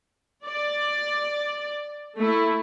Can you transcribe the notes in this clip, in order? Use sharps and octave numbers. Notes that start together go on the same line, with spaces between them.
D5
A3 E4